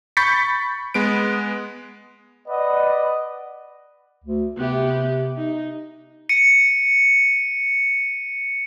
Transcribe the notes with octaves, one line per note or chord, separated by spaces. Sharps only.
B5 C#6 G6 A6 B6 C#7
G#3 B3 B4 D7
B4 D5 D#5 F#5
D2
C3 B3 G4
D#4
C#7 D#7